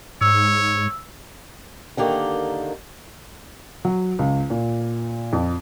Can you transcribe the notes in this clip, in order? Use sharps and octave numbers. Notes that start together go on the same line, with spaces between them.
G#2 C#5 E6
D3 D#3 A#3 G4
F#3
C#2
A#2
F2